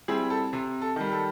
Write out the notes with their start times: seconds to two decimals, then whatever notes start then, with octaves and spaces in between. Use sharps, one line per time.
0.08 G3 C4 E4 G#4
0.30 A4
0.53 C3
0.82 A4
0.96 D#3 G3
1.12 A4